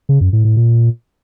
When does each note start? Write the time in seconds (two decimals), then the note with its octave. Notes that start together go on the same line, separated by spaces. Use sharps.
0.09 C#3
0.21 F#2
0.33 A2
0.45 A2
0.56 A#2